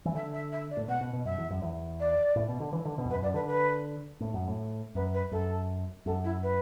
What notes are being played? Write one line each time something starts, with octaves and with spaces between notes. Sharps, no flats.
E3
D3 E5
E5
E5
D5
A2
B2 F#5
B2
B2
F#2 E5
E2
F#2
E2
D5
A2
B2
D3
E3
D3
B2
E2
F#2 B4
F#2 D5
D3 B4
B4
A2
F#2
A2
F#2 B4
B4
F#2 A4
F#2 A4
E4
B4